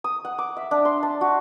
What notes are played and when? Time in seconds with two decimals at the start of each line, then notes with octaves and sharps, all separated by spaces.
0.04 D#6
0.25 F#5
0.38 D6
0.57 E5
0.71 D4
0.85 C6
1.03 A5
1.21 F#4